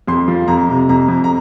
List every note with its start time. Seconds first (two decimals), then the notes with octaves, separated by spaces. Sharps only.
0.08 F2 C6
0.28 F3
0.48 F2 A#5
0.69 C3
0.89 F2 A#5
1.08 F2
1.24 A#5